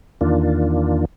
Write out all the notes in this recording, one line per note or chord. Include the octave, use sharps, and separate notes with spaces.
E2 D#3 A#3 D4 F4